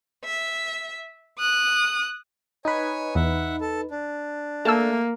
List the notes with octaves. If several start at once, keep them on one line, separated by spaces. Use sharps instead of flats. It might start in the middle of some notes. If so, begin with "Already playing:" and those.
E5
D#6 F#6
D#4 B4 C#5 G#5
E2 E5 F#5
A4
D4
A3 A#3 A5 E6